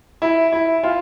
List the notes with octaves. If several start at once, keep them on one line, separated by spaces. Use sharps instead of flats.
E4
E4
F4